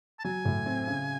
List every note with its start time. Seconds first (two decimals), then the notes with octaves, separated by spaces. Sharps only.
0.19 A5
0.24 F#3 G#5
0.45 A2
0.66 C4
0.87 C#3